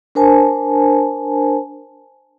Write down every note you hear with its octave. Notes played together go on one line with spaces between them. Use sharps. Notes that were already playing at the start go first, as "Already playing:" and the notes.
D4 A#4 C5 G#5 A5